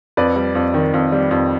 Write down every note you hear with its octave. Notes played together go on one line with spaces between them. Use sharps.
F2 B4 D5
G3
F2
D#3
F2
G3
F2